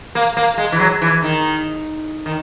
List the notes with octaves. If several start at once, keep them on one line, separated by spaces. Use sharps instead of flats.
A#3
A#3
G#3
E3
F#3
E3
D#3
D#3